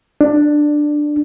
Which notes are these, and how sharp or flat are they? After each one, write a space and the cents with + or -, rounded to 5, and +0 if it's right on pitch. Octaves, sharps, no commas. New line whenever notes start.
D4 +10